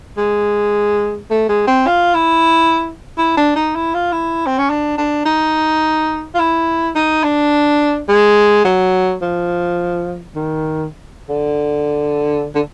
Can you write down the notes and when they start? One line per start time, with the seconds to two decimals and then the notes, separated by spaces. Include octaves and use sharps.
0.17 G#3
1.31 A3
1.49 G#3
1.67 C4
1.87 F4
2.14 E4
3.18 E4
3.37 D4
3.56 D#4
3.76 E4
3.94 F4
4.12 E4
4.46 C4
4.58 C#4
4.70 D4
4.98 D4
5.25 D#4
6.35 F4
6.39 E4
6.96 D#4
7.24 D4
8.09 G#3
8.65 F#3
9.22 F3
10.35 D#3
11.29 D3
12.55 D3